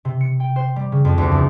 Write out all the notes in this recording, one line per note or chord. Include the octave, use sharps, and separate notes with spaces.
C3
C#7
G5
C5
G3
C#3
F2
D2
E2